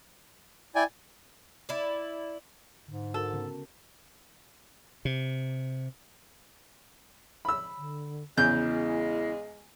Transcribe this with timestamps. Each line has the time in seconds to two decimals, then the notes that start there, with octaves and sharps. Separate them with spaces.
0.75 E4 D5 G5 G#5
1.69 E4 D5
2.88 G#2 D3
3.14 F#4 A4 A#4
3.33 C#3 B3
5.05 C3
7.45 B5 E6
7.77 D3
8.38 E2 C#3 G#3 E4 G6